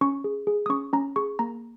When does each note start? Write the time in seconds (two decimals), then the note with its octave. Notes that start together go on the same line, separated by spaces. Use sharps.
0.01 C#4 C#6
0.24 G#4
0.47 G#4
0.66 D#6
0.69 C#4 C#6
0.93 C#4 A#5
1.16 G#4 C#6
1.39 A#3 A#5